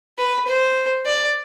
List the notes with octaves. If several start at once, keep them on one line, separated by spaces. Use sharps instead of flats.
B4
C5
D5